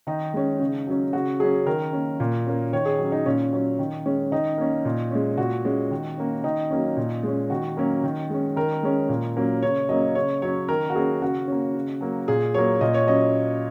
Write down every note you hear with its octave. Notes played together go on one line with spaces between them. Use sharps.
D#3 D#4
G#3 C#4
C#3
F#3 C#4
C#3 F#4
F#3 C#4 G#4
D#3 A#4
A#3 C#4
A#2
A#3 C#4
D#3 C#5
G#4
F#3 C#4
D#4
A#2 C#4
F#3 C#4
D#3
G#3 C#4
D#3 D#4
A#3 C#4
A#2
G#3 C#4
A#2 F#4
G#3 C#4
D#3
A#3 C#4
D#3 D#4
F#3 A#3 C#4
A#2
G#3 C#4
D#3 F#4
F#3 A#3 C#4
D#3
G#3 C#4
D#3 A#4
G#3 C#4
A#2
F#3 A#3 C#4
C#3 C#5
F#3 A#3 C#4 D#5
C#3 C#5
F#3 C#4 C#5
D#3 A#4
F#4
A#3 C#4 G#4
C#3 F#4
A#3 C#4
C#3
F#3 A#3
A#2 G#4
F#3 A#3 C#5
A#2 D#5
C#5
F#3 C#4 D#5